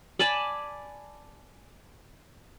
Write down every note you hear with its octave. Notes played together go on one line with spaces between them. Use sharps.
D5 G#5 A5 B5